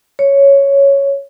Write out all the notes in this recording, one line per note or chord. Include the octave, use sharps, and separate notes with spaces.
C#5